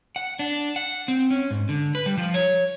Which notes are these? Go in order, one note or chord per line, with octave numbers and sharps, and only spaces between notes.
F#5
D4
F#5
C4
C#4
G#2
D3
B4
G3
F3
C#5